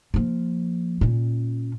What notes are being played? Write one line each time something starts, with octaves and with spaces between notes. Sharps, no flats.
F3 A#3
A#2 C#4